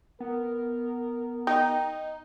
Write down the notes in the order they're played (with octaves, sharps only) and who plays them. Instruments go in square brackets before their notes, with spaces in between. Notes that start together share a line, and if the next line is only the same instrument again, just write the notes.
[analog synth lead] B3 [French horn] A#4
[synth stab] D#4 [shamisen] G5